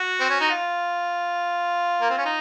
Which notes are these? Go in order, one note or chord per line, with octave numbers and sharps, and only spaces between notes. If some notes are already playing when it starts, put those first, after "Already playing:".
Already playing: F#4
C4
C#4
D#4
F4
A#3
C4
C#4
D#4